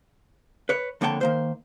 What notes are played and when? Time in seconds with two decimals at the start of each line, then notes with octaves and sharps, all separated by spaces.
0.69 B4 C#5
1.01 F2 D3 A#3 C#5 G5 A5
1.21 D#3 A#3 C5